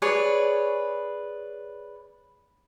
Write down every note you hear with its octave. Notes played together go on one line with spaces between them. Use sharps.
G#4 B4 C#5 D5